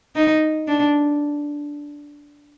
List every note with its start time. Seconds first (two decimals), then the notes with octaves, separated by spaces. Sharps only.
0.16 D#4
0.68 D4